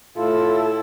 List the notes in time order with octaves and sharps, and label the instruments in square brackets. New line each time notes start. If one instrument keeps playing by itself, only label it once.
[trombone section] A2 [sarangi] E4 [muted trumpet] F4 [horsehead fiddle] A4